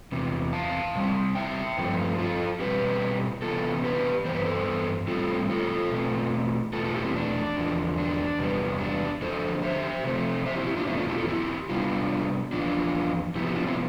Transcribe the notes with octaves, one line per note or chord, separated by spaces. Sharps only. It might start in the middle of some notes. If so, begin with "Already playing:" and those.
E2 C3
F5 A5
C3 G3 C4
E5 G5
G2 F3 A3 C4
F4 A4
B2 G3 C4 G4 B4
C3 E3 B3 F4 A4
G4 B4
G2 E3 B3 C5
B4
A4 C5
A2 G3 C4 F4 A4
F4 A4
B2 A3 C4
E2 B2 A3 F4 A4
F4 A4
E4 G4
C4 E4
D4
E2 D3 F3
D4
E2 C3 G3 B3
D4
F2 D3 F3 A4 C5
C5 E5
C3 F3 A3 C4
C5 E5
E4 G4
E4 G4
D4 F4
E2 B2 A3 C4 E4
D4 F4
E4 G4
F4 A4
E4 G4
C3 G3 B3 D4 F4
E2 C3 F3 D4 F4
C3 F3 B3 E4 G4
E4 G4
D4 F4
C4 E4